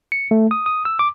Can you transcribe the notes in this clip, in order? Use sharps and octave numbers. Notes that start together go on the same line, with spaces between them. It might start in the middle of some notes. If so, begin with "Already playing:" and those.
C#7
A3
D#6
D#6
E6
D6